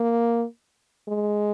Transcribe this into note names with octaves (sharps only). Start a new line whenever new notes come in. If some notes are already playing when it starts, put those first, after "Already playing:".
Already playing: A#3
G#3